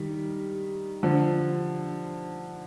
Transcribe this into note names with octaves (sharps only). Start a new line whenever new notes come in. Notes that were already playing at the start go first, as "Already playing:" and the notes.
Already playing: D#3 G3
D3 F3